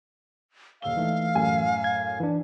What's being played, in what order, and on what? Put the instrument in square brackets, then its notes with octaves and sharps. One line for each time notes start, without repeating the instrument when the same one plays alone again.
[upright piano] D#1 E6 G7 [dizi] F5
[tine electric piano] E3 A3 [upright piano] D#4
[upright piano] F#2 A2 G#5
[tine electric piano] G#6
E3 D4